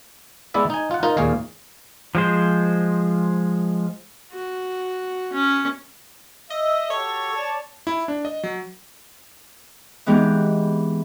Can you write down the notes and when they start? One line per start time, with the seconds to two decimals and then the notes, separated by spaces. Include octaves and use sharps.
0.54 G#3 B3 E4 D5 E5
0.70 D#4 G#5
0.91 F4 F#5
1.03 D#4 F4 A#4 D#5
1.17 D#2 A#2 G#4 C#5 F5
2.15 F3 G#3 C5
4.32 F#4
5.33 C#4
6.50 D#5 E5
6.90 F#4 G4 A4 C#5
7.34 D5 A5
7.87 E4
8.08 D4
8.25 D#5
8.43 F#3
10.06 E3 G#3 B3 C4 D#4 G4